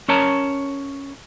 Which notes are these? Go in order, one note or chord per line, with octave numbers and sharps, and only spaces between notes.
C#4 A#4 C#5 A5 A#5